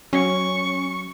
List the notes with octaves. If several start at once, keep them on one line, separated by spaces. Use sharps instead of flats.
F#3 C#4 C#6